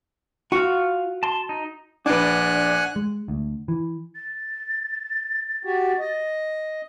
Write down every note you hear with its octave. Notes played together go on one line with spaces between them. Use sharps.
F4 F#4 F5
A5 C6
D#4
A#1 D4 B4 D5 F#5 G#5 D6
G#3
D2
E3
A6
F#4 G4
D#5